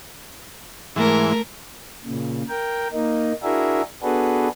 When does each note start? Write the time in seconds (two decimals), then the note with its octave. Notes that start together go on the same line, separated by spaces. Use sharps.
0.96 G#2 E3 A3 A#4
2.05 A#2 C#3
2.49 A#4 G5
2.93 A#3 D#4
3.43 D4 E4 F#4 G#4 A#4 E5
4.03 B3 D4 F#4 G#4 A4 B4